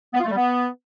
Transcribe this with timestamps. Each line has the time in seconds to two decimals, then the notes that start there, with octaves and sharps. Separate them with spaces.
0.14 B3
0.20 F4
0.25 A3
0.31 G3
0.36 B3